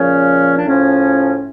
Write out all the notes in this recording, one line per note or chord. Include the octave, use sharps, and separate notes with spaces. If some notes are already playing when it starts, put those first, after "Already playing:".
Already playing: A#2 C#3 F3 C#4
D4
A2 C#3 F3 C#4